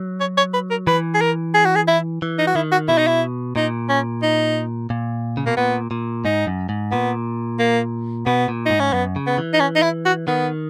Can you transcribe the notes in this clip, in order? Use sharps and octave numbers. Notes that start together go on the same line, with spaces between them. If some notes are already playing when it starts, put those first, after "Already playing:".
Already playing: F#3
C#5
C#5
B4
A#4
E3 B4
G#4
A#4
G#4
F#4
G#4
E4
E3
D#4
F#4
D#3 E4
F#4
B2 E4
D#4
E4
A#2 D#4
C#4
D#4
A#2
C#3
B2 A#3
A#2 B3
A#2
G#2 D#4
F#2
G#2
A#2 B3
A#3
B2 B3
A#2
G#2 D#4
C#4
F#2 B3
C#3
B3
E3
D#4
C#4
D#4
E4
F#4
D#3 B3